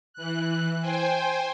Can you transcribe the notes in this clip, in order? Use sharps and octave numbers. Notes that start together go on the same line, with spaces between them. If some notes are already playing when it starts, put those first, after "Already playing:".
E3 F#6
C5 G5 G#5